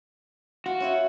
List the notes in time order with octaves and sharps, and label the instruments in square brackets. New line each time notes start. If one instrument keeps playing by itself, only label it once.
[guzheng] F4 [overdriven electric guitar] F#4
[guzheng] C#4 E4 F4